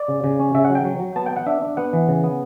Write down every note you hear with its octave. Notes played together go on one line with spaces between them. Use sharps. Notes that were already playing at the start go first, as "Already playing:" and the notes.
Already playing: D5
C#3
C#3
C#4
C#3 E5
F#5
F#3
G5
F#3
F#3
B3 A5
G5
B3
F#5
D4 E5
D4
B3 F#5
E3
C#3
B3